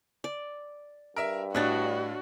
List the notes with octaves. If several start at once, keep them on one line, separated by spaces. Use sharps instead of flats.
D5
G2 A#4 E5
A2 D4 F#4 C#5 D#5 F#6 A6